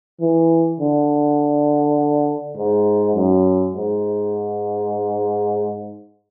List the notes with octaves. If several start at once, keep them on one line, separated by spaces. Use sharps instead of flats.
E3
D3
G#2
F#2
G#2